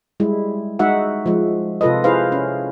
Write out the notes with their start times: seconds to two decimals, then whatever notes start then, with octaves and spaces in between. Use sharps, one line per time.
0.20 G3 G#3 E4
0.79 G#3 D#4 F#4 E5 F#5
1.26 F3 G#3
1.81 C3 F4 A4 B4 D#5
2.04 E4 G#4 B4 C5 F5
2.32 C#4